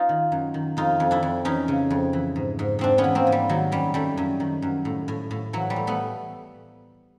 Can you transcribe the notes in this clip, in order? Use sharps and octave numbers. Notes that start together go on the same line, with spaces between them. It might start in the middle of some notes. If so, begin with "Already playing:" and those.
Already playing: D#4 F4
D#3
F#2
D#3
F2 D#4 F4
F2
D4 E4
F2
E3 C#4 D#4
C#3
F2
E3
G#2
G#2
G#2 C4 D4
B3 C#4
E3
A#3 C4
G#2
G3
D#3 F#3
F#2 G3
F#2 G3 A3
F#2
D#3
F#2
A2
A2
A2
E3 F#3
G3
A2
A3 B3